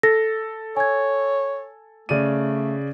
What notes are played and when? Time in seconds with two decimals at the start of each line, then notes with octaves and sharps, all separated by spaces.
0.03 A4 A#6
0.77 C#5 G#5 G#6
2.09 C#3 A3 D5 D#7